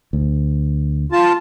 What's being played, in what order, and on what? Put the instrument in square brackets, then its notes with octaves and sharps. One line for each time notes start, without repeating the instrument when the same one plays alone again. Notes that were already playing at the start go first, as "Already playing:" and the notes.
[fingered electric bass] D2
[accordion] F4 A5